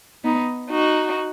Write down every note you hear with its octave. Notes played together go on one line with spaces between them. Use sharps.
B3 D#4
D#4 F#4